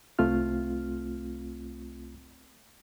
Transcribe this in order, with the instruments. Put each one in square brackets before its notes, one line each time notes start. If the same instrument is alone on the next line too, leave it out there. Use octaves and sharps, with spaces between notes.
[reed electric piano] C2 A3 C4 F4 F6